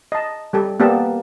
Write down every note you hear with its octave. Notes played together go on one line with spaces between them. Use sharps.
D#5 A5
G3 G4 A4
A#3 B3 G4 D5 A5